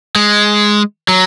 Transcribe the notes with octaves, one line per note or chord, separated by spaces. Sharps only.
G#3
F#3